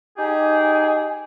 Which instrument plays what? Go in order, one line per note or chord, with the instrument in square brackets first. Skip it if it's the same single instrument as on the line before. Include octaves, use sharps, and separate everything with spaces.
[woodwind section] D#4 G4 G#4 G5 G#5